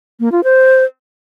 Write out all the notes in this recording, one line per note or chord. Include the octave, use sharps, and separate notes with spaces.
A#3
F4
C5